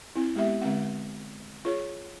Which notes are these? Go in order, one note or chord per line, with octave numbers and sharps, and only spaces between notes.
C4 E4
G#3 B3 G4 E5
D3 G#3 C4 F#5
F4 G#4 C#5